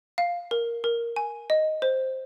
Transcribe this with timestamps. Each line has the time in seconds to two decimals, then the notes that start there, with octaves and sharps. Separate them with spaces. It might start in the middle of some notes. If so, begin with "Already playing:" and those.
0.18 F5
0.51 A#4
0.84 A#4
1.16 G#5
1.50 D#5
1.82 C5